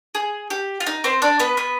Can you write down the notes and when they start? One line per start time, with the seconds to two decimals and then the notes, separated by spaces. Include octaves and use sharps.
0.15 G#4
0.50 G4
0.80 F4
0.87 D#4
1.04 C4 C5
1.22 D4 D5
1.39 B3 B4
1.57 B3 B4